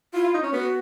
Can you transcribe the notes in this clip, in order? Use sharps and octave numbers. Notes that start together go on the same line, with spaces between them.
E4 F4
F4
D#4
C#4
B3 F#4